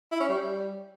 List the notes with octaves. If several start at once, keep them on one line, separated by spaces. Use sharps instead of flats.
E4
C#4
G3